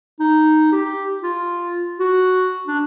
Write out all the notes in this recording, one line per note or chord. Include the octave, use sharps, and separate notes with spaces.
D#4
G4
F4
F#4
D4